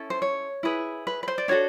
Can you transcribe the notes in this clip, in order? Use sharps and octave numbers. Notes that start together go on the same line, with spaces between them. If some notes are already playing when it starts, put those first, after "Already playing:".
Already playing: C#4 E4 A4
C5
C#5
E4 G#4 B4
B4
B4
C5
D5
D4 F#4 A4 C#5